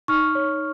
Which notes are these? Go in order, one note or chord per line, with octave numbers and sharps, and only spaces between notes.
D#4 C#6 F6
C#5